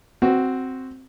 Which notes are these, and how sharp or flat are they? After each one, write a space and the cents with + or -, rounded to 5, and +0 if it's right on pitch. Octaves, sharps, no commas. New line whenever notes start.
C4 +0 F#4 +5